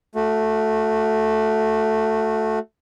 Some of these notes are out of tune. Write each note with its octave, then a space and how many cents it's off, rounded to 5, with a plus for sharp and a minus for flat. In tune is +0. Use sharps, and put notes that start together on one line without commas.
A3 +0 F#4 -25